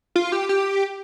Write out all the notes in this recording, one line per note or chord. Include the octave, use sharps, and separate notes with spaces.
F4
G4
G4